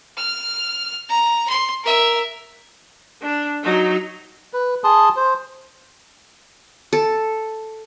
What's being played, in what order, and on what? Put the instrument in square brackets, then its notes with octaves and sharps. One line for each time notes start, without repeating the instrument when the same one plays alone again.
[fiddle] F6
A#5
C6
A#4 E5
[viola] D4
F#3 D#4
[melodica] B4
G#4 A5 C6 D#6
C5
[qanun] A4